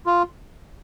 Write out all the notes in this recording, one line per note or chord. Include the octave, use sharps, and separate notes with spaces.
F4